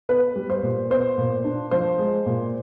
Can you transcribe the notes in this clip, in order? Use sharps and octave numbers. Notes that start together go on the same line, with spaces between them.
B3 B4
G3
C5
A#2
B3 C5
A#2
D4
F3 C5
G#3
A#2